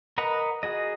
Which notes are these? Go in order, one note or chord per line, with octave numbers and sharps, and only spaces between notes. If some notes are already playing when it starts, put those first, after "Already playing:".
A#4 B4 D#5 F#5 A#5
F#4 G#4 D#5